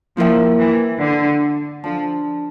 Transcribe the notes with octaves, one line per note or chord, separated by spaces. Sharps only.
F3 A#3 E4 A#4 E5 G5
E3
D3
F3 D4 A4 D5 A5